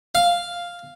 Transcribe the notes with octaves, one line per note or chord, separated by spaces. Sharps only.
F5